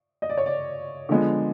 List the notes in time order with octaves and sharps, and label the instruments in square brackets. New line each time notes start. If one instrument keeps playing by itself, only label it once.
[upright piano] D#5
D5
C#5
D5
D3 F3 G#3 B3